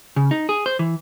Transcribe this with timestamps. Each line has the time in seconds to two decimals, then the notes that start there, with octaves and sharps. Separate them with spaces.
0.16 C#3
0.31 D#4
0.49 G#4
0.66 C5
0.79 E3